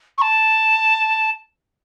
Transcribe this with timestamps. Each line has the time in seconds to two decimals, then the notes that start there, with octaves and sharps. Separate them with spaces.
0.18 C#6
0.21 A5